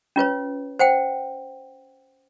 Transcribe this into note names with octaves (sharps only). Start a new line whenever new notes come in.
C#4 F4 B4 C#5
C5 F#5 G5